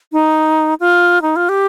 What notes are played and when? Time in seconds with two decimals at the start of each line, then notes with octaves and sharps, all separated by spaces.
0.12 D#4
0.80 F4
1.22 D#4
1.36 F4
1.49 G4